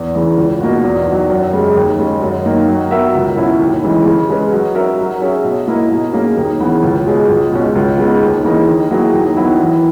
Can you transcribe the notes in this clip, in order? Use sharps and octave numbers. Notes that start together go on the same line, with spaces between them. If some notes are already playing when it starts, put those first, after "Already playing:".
Already playing: E2
C#3 E3
C#2
B2 A#3 D#4 F#4
E2
D#3 F#3
F#2
C#3 G#3
D#2
C#3 G#3
F#2
D#3 A#3 D#4
F#3
B3 F#4 A#4 E5
C#2
B2 F#3 C#4 E4
D#2
C#3 E3 G#3
C#3
G#3 C#4 G#4 B4
F#3
C#4 F#4 A#4 E5
F#3
C#4 G#4 C#5 E5
B2
A#3 E4 A#4 D#5
B2
A#3 C#4 G#4
D#2
C#3 E3 B3
C#2
B2 G#3 C#4 G#4
C#2
B2 G#3 C#4
C#2
C#3 G#3 B3 D#4
D#2
C#3 E3 A#3 D#4
D#3
F#3 A#3 E4 G#4
D#2
D#3 F#3 B3 E4
E3